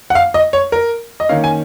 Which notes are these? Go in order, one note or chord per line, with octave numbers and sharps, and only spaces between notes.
F#5
F5
D#5
C#5
A#4
D#5
D#3 A#3 C#4 F5
G#5